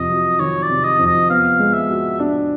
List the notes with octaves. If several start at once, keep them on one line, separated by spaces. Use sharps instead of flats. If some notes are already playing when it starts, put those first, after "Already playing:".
Already playing: F2 C3 D#5
F#3
D#3 C#5
D5
C3
D#5
F2
D#5
B3 F5
G#3
E5
F#4
D4